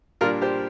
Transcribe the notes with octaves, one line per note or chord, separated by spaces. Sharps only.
A#2 G3 D4 F4 A#4
G4 C5